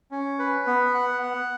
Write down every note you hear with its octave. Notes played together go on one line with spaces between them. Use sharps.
C#4
B4
B3
F#5
F#5